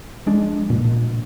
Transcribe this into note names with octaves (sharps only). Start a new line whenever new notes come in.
F3 G#3 D4
A#2